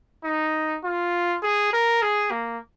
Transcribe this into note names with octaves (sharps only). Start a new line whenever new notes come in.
D#4
F4
G#4
A#4
G#4
A#3